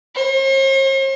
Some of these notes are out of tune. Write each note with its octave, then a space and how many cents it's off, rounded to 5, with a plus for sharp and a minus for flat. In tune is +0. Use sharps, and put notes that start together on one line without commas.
C5 +45